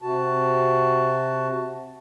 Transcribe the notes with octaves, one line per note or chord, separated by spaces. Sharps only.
C3 F#4 A5